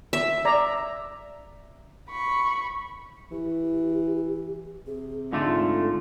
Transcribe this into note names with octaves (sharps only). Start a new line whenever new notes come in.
E5
D5 A#5
B5 C#6
E3 G4
C3 G#4
G#2 D3 A3 F4 A4